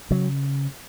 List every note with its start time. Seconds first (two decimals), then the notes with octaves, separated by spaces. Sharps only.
0.10 C#3 F#3